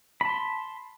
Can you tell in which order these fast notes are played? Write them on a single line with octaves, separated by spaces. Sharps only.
B5 A5 C6